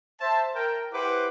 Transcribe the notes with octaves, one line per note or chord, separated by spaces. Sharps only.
C5 E5 A5
A#4 G5
E4 G4 B4 C5 F#5 D6